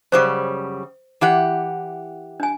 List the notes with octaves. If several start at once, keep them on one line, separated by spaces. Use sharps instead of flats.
F#2 C#3 G3 C5 C#6 D6
E3 G4 F#5
D4 G#5